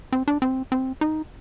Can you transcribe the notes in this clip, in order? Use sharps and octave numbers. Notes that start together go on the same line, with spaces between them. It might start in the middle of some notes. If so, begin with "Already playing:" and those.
C4
D4
C4
C4
D#4